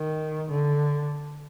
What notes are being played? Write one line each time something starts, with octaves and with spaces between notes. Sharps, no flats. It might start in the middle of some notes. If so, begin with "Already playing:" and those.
Already playing: D#3
D3